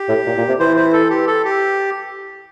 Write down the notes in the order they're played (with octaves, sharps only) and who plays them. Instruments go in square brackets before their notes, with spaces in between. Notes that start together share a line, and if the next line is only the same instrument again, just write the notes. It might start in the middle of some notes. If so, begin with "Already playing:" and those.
Already playing: [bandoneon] G4
[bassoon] A2
A#2
A#2
C3
[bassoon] E3 [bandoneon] C5
[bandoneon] C5
A4
G4
A4
G4